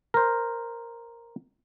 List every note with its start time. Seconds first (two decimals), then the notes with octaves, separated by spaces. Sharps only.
0.14 A#4 C5